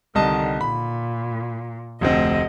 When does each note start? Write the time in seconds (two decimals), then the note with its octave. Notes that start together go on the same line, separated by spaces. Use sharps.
0.15 C2 D3 D#3 D#5 A5
0.61 A#2 B5
2.01 F1 D2 C4 D#5